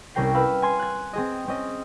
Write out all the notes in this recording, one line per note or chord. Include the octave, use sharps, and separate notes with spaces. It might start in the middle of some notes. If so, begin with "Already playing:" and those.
C2 C#4 A#4 G5 C7
B4 F5 B5 E6 G6
G#5 C6 G#6
F#6 G#6
C4 G#4 D#5
C4 C#4 D#5